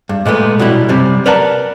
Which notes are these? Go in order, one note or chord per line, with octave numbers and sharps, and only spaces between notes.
G2
A#2 G#3 A3 B3
B2 F#3 G3 E4
F#2 C3 G3
A#4 B4 D5 F#5 A5 A#5